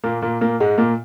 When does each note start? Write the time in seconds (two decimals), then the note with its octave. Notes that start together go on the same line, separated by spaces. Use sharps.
0.04 A#2 A#3
0.22 A#2 A#3
0.41 A#2 A#3
0.60 G#2 G#3
0.78 A#2 A#3